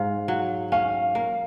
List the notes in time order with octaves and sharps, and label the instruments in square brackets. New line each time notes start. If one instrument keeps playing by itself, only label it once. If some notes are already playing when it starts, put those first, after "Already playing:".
Already playing: [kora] G#2 [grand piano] F5
[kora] F#3
[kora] C#4 [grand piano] F5
[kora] A#3